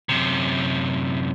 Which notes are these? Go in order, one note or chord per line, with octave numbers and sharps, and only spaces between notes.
F#2 C3